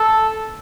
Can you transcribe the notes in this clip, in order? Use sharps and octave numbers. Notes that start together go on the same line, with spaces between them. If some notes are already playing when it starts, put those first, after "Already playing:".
Already playing: A4